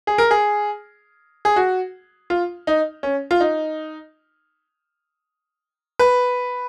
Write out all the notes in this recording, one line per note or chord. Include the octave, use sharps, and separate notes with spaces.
G#4
A#4
G#4
G#4
F#4
F4
D#4
C#4
F4
D#4
B4